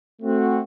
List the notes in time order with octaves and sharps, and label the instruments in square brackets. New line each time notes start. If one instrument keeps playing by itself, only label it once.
[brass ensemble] A3 C4 F#4